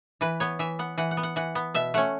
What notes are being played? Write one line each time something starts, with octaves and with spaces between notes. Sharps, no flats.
E3 B4
B3 C#5
E3 E5
B3 F#5
E3 F#5
F#5
B3
F#5
E3 F#5
B3
B2 E5
A3 C#4 F#5